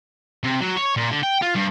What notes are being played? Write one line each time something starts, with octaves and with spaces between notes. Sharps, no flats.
C3
F#3
C#5
A#2
D3
G5
F4
G2